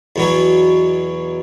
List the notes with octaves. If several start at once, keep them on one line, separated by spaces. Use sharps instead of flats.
E2 B2 F#3